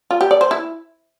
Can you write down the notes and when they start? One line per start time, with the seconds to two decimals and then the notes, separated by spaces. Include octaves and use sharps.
0.11 F4
0.21 G4
0.31 D5
0.41 C5
0.51 E4